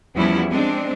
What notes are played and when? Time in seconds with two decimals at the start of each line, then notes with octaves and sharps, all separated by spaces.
0.15 E2 F3 G3 B3 C#4 E4
0.50 G#3 C4 D4